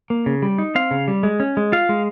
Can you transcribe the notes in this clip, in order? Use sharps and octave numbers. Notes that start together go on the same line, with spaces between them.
A#3
C#3
G3
D#4
C4 F5
C#3
G3
G#3
C#4
G#3
F4 F5
G#3